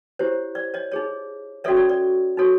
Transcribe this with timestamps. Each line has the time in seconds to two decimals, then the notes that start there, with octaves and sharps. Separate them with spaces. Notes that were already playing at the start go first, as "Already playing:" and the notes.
0.19 E4 G4 C5 C#5
0.55 D5
0.74 C#5 D#5
0.92 D#4 G#4 C#5
1.64 C#4 F#4 A4 C#5 D5 E5
1.77 D5
1.89 D5
2.37 D#4 F#4 A4 C#5